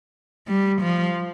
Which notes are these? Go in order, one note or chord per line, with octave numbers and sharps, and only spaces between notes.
G3
F3